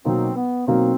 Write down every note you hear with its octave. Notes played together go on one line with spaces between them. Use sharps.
B2 F#3 A#3 C4 D#4
B3
B2 F#3 A#3 C4 D#4